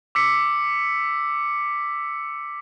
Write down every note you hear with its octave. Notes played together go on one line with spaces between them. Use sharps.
D6 E6 B6 C#7